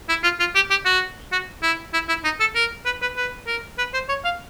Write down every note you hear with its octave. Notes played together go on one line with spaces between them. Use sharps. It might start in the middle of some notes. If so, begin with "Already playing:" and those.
E4
F4
F4
G4
G4
F#4
F#4
E4
E4
E4
D#4
A4
A#4
B4
B4
B4
A#4
B4
C5
C#5
F5